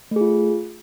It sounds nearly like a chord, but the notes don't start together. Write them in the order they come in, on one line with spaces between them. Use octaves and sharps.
A3 G#4 F4